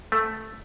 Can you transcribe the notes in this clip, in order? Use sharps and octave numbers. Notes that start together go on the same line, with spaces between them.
A3